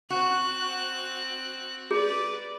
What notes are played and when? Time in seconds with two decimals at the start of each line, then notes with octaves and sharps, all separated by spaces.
0.10 C4 F#4 F#6
1.91 G#4 B4 D5